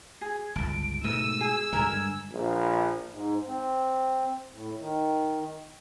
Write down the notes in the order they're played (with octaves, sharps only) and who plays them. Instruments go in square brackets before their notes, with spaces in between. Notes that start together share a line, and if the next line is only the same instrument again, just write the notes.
[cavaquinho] G#4 [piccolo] G#6
[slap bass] G1 C#2 [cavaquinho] A5 [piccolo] D7
[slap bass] G#2 B2 A3 [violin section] E6 [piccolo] D#7
[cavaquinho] G#4 [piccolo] G#6
[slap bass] G2 D3 G#3 [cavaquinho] A#4 G#5
[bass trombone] A#1
[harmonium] G#2
C4
A2
D#3